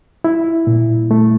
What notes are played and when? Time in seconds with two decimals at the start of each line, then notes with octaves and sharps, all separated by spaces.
0.24 E4
0.67 A#2
1.11 A3